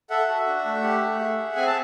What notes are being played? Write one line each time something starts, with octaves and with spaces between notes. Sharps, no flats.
A4 E5 F#5
F#4
D4
A3
G4
A3
G#4
G#4
C4 G#5
A5